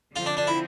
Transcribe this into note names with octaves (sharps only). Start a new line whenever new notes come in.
D3 F3 C4 F4
D4
D4
E4